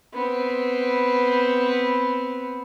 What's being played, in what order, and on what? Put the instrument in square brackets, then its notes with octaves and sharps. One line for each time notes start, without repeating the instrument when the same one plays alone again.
[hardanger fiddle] B3 C4